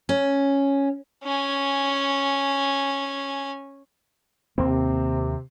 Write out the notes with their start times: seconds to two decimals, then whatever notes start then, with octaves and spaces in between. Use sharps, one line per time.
0.09 C#4
1.24 C#4 G#5
4.58 D#2 C3 A#3 C4